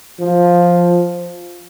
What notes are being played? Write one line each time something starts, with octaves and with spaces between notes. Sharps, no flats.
F3